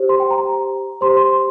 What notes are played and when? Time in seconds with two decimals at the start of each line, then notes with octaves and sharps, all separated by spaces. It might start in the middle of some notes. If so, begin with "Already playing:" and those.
Already playing: G4 C5
0.09 C6
0.20 G5
0.31 A#5
1.01 G4 C5 C6
1.17 C6